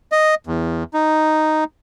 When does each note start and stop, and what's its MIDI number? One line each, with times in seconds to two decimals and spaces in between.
0.12 0.35 75
0.47 0.84 40
0.94 1.64 63